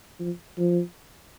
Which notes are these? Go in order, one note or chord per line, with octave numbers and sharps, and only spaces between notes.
F3
F3